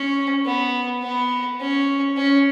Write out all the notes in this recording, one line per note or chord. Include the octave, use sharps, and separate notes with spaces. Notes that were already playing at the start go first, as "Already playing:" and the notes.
Already playing: C#4
B3
B3
C#4
C#4